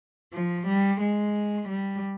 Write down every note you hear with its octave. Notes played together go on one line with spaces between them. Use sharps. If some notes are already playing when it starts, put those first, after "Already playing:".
F3
G3
G#3
G3